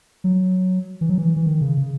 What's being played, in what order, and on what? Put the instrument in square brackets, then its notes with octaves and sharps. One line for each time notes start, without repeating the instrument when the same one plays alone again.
[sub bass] F#3
E3
F#3
E3
E3
D#3
C#3
C#3